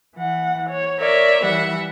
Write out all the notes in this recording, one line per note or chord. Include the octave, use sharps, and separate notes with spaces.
E3 F#5
C#5
A#4 C#5 D5 E5
E3 G3 E5 F#5